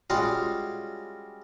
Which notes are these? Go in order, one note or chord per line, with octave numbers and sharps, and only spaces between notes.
G3 G#3 C#4 F4 F#4 F5